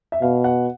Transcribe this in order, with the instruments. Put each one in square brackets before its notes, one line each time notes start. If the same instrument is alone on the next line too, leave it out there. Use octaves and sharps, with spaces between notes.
[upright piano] E5
[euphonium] B2 [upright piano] F5
[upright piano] F#5